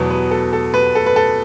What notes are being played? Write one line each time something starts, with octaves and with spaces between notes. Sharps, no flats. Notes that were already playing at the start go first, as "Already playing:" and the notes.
Already playing: E2 B2 F#3 B3
B4
A4
A4
B4
A4
B4
A4